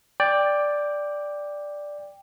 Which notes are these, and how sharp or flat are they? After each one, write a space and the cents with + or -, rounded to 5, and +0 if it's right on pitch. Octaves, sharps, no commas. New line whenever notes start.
D5 +0 G5 +15